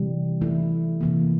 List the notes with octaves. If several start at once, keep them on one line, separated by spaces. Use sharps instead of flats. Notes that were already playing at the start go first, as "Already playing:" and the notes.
Already playing: C3 E3 G3
E3 A3 E4
C3 E3 A#3